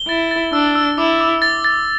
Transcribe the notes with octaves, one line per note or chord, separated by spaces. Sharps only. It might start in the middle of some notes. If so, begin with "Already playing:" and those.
Already playing: G7
E4 A6
A6
D4 E6
E6
E4 D6
D6
A6
A6